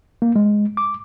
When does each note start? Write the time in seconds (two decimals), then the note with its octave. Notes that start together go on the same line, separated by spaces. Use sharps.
0.22 A#3
0.36 G#3
0.77 D6